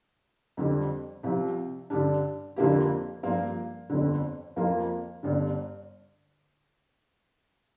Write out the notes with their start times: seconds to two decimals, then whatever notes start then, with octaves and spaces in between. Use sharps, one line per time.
0.57 F2 D3 G3
1.23 C2 C3 F3
1.90 G2 D3 G3 D4
2.56 F2 D3 F3 A#3 G4
3.23 G2 F3 A#3 F4 A#4
3.90 G1 F2 D3
4.56 F2 F3 A#3 F4 A#4
5.23 G1 G2 D3